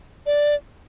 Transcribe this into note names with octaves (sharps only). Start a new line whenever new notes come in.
D5